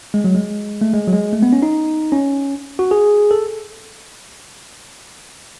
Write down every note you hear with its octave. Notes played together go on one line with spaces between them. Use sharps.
G#3
F#3
G#3
A3
G#3
F#3
G#3
A3
B3
C#4
D#4
C#4
F#4
G#4
A4